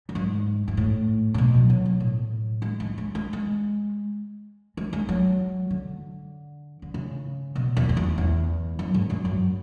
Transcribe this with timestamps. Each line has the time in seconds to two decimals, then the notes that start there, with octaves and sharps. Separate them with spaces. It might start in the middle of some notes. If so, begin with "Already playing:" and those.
0.09 F#2
0.15 G#2
0.68 G#2
0.77 A2
1.34 A2
1.38 B2
1.54 F#3
1.70 F#3
1.85 B2
2.00 A2
2.62 G#3
2.80 G#3
2.98 G#3
3.15 G#3
3.33 G#3
4.77 G#3
4.93 G#3
5.09 F#3
5.70 D3
6.82 D3
6.94 C#3
7.55 B2
7.77 E2
7.89 F#2
7.97 E2
8.18 E2
8.79 F#2
8.94 G#2
9.10 F#2
9.25 F#2